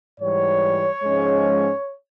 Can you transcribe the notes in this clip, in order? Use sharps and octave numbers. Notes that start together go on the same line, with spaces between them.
G#2 E3 G3 C#5
G#2 F3 G#3 C#4